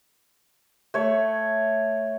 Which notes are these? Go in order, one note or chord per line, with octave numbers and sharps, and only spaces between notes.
A3 C#5